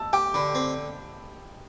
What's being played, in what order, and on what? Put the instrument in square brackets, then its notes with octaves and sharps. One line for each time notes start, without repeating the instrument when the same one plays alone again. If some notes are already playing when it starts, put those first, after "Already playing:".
Already playing: [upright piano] A5 E6
[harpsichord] G4 [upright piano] G5
[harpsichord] D3 [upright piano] B5
[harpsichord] C4